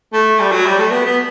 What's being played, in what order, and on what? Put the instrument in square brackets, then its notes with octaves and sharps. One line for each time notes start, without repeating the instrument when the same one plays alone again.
[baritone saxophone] A3
G3
F#3
G3
A3
B3
B3